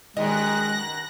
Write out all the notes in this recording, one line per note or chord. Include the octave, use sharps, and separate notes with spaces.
F#2 B2 D#3 G#3 D#5 F#6 A#6